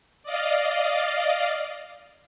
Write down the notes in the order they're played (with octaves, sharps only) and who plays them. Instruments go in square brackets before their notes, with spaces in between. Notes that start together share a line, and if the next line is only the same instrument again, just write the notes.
[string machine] D5 D#5 F5